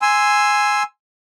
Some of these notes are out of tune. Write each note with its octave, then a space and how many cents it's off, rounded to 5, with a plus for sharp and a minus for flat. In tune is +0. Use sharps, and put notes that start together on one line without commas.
G#5 +0 C6 +0 E6 +0